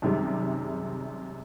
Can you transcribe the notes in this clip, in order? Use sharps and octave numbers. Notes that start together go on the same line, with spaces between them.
F#2 C3 D#3 G3 G#3